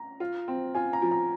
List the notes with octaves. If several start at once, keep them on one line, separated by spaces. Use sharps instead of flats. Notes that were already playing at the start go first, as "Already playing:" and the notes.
Already playing: A#5
F4
C4
F4 G#5
A#5
F3
A#5